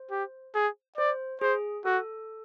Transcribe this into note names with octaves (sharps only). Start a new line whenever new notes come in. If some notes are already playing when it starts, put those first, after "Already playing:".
Already playing: C5
G4
G#4
C5 D5
G#4 C5
F#4 A4